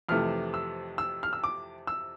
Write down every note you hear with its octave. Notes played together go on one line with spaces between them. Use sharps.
F2 C3 E3 A3 F6
E6
E6
F6
E6
D6
E6